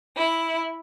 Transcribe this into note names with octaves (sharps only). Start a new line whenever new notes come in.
E4